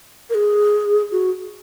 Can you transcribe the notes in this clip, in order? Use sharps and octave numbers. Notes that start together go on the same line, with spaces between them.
A#4
G#4
F#4